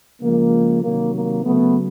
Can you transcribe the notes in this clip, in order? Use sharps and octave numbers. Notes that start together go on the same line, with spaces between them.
C#3 F3 G#3 A#3
C3 D#3 F#3 A#3
A#3
C#3 F#3 A3 B3